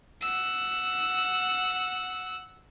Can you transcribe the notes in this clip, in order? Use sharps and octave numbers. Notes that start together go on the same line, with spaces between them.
F#5 E6